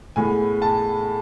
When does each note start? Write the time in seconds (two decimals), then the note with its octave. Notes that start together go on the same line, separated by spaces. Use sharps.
0.16 A2 G#3 B3 G#5
0.62 A5